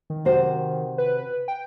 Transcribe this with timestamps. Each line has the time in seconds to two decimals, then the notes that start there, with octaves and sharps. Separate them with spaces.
0.10 D#3
0.25 C3 F#4 C5
0.98 B4
1.48 G5